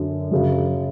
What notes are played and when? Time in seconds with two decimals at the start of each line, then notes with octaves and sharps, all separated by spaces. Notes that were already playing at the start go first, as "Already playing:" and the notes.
Already playing: F#2 D3 F#3
0.31 F#2 C#3 F#3